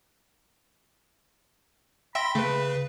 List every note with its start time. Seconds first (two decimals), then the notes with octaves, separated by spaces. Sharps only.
2.15 E5 G5 B5 C6 A#6
2.35 C#3 A3 B4